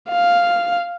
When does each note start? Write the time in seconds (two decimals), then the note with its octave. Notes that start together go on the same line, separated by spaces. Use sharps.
0.10 F5